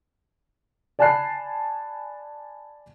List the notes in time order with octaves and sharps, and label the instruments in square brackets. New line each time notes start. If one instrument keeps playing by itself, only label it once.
[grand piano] D5 G#5 A5 B5 F#6 C7